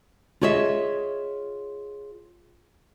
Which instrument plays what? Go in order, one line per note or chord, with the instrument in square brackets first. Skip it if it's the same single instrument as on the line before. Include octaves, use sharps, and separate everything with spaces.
[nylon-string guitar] F4 G#4 C#5 D#5 E5